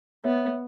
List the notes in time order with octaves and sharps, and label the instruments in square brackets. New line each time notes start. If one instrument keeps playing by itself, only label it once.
[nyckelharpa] B3 [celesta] C#5 E5